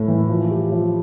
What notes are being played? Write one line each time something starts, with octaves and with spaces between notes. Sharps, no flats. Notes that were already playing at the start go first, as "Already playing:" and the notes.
Already playing: A2 A3
E3
F3
G4
F3